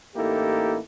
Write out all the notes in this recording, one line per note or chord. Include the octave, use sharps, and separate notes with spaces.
A1 A#3 D#4 E4 G4 A4